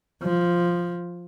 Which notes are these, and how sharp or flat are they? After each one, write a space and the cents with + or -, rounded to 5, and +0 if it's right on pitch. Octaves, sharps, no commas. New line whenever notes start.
F3 +0